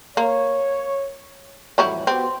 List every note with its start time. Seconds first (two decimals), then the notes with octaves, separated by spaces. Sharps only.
0.17 A#3 C#5
1.78 F2 A2 E3 F#3 G3 E4
2.07 B3 C4 F#4 G4